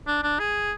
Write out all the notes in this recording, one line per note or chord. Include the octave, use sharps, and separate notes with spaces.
D4
D4
G#4